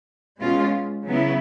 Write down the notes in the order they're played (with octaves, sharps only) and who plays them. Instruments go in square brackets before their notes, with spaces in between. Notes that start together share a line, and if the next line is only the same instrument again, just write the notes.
[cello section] B2 G#3 C#4 F4
C#3 F#3 B3 E4